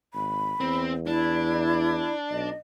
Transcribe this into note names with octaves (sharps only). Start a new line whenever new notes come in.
G#1 B5
E2 C4
D4 E4
B1 D#5